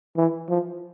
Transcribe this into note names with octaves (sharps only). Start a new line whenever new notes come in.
E3
F3